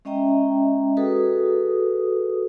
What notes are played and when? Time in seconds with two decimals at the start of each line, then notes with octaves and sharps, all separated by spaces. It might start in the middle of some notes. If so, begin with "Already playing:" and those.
0.05 G#3 C#4 D#5 E5 G5 A#5
0.97 F#4 G#4 A4 B4 D#6